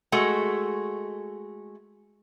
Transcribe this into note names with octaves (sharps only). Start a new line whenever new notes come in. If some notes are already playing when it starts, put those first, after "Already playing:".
G#3 A3 F#4